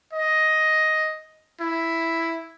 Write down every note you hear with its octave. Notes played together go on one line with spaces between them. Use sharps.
D#5
E4